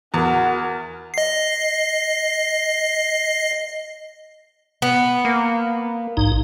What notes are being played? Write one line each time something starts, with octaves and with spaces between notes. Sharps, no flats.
E2 F#4 A#4
D#5 C7
B3
A#3
A#1 G#2 D#4